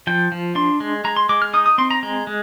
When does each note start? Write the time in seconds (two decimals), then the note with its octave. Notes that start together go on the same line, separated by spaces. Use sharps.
0.07 F3 G5
0.32 F3
0.55 D4 C6
0.80 G#3
1.04 G#3 A#5
1.17 C6
1.29 G#3 D6
1.42 F6
1.54 D#4 D#6
1.66 D#6
1.78 C4 C6
1.91 A#5
2.03 G#3 A#5
2.27 G#3